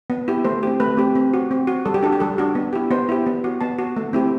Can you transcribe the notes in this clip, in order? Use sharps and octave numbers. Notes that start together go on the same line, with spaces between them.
B3
E4 G4
A3 C5
C4 G4
A3 B4
C4 G4
C4
F#4
C4
F#4
G3 A4
G4
D4 F#4 A4
G4
G3 A4
D4 F#4
B3
E4 G4
B3 C5
E4 G4
B3
F#4
B3 A5
F#4
A3
C4 E4 G4